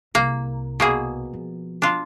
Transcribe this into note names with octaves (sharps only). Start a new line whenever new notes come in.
C2 A#3
B2 A#3 G#4
F3
D4 F4